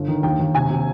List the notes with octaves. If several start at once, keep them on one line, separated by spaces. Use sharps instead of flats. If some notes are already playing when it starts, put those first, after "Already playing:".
Already playing: G1
D#3
D#2 G5
D#2
C3 G#5
C3